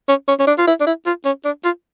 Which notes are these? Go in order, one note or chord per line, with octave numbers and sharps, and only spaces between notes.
C#4
C#4
C#4
D4
F4
E4
D4
E4
F4
C#4
D4
F4